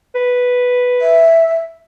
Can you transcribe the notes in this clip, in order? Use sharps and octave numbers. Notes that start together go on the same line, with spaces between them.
B4
E5